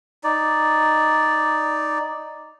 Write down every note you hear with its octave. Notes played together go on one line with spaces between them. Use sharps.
D#4 D5